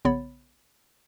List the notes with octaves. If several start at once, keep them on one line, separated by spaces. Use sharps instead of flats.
A#1 C#3 B3 C#5 B5 A6